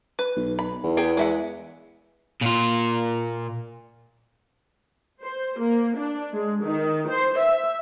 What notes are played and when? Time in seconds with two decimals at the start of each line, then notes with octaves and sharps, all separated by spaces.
0.19 B4
0.36 B1
0.59 B5
0.84 E2
0.97 B3 G#4 G5
1.17 G#3 E5 F#5
2.42 A#2 F4
5.22 C5
5.59 A#3
5.97 D4
6.33 G#3
6.63 D#3
7.09 C5
7.38 E5